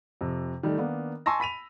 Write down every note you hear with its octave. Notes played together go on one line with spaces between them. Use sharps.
F2 C3
D#3 G3 A3
D#3 A#3 B3 D4
G#5 A5 C6 C#6 E6 A#6
B5 B6 D#7 F7